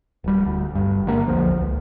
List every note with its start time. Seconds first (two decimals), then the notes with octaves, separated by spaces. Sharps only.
0.24 D1 G3
0.46 D2
0.75 G1 G2
1.07 D3 G#3 A#3
1.28 A#1 E2 D3 F3
1.61 C#2